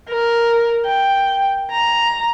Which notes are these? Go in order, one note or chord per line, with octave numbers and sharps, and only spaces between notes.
A#4
G5
A#5